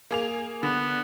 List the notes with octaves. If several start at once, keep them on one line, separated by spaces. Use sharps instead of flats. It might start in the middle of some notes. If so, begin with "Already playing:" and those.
A#3 G#4 F7
D3 B3